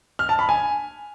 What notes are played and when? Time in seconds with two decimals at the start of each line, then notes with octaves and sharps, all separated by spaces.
0.19 F6
0.29 A5
0.39 B5
0.49 G#5